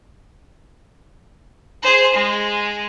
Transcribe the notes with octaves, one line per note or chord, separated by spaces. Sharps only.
G#4 C5
G#3